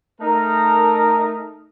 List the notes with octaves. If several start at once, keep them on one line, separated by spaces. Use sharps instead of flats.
A3 D#4 A#4